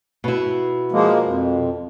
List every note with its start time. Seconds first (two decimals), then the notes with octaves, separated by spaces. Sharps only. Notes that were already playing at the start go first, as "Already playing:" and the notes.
0.24 B2 E4
0.92 F3 G#3 A#3
1.24 F2